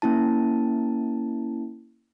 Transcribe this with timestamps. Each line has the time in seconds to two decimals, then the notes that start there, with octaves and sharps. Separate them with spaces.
0.02 A#3 C#4 E4 A5